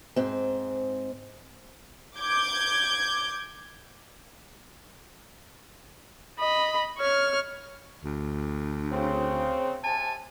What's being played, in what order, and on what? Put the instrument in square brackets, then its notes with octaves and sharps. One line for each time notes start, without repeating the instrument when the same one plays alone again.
[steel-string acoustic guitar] G#2 C4
[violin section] D6 G6 G#6
[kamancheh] D#5 B5
C#5 F6
[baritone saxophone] D2
[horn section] C#3 C4
C3 G#5 A5